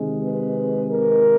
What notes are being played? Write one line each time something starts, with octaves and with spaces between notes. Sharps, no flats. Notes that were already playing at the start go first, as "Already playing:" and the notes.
Already playing: C3 D#3 G#3
B4
A#4